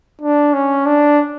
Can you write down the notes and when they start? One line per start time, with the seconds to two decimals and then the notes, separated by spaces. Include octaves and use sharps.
0.21 D4
0.54 C#4
0.86 D4